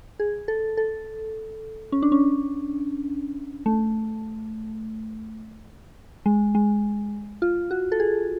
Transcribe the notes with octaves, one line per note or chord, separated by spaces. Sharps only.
G#4
A4
A4
C#4
D4
C#4
A3
G#3
G#3
F4
F#4
A4
G#4